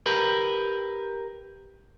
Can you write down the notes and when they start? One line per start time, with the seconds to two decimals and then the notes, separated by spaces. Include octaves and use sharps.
0.06 G4 A#4 B4